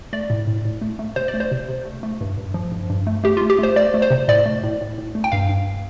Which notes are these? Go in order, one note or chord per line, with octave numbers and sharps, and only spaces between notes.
A3 D5
A2
A2
A2
A3
A3
C3 C5
D5
A3
C5
C3
C3
A3
A3
G2
G2
F3
G2
G2
A3
A3 G4
F4
A3
G4
A3 C5
A3 D5
A3
C5
C3
A2 D5
A3
A2
A2
A2
A3
G5
G2 F5
G2